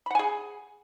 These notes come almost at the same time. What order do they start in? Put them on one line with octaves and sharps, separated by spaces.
B5 F#5 G#5 G#4